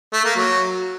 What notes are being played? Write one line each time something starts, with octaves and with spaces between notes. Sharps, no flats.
A3
A#3
F#3